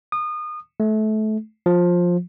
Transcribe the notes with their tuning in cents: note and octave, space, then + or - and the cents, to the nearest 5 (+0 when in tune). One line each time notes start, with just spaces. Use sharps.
D#6 -30
A3 -25
F3 +15